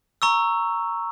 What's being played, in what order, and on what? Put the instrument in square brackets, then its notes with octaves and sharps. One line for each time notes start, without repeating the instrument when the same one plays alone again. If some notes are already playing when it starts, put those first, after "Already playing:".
[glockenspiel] A#5 C#6 E6